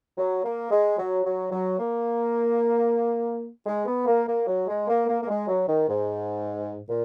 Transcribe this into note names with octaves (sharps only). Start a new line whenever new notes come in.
F#3
A#3
G#3
F#3
F#3
F#3
A#3
G#3
B3
A#3
A#3
F#3
G#3
A#3
A#3
A#3
G#3
F#3
D#3
G#2
A#2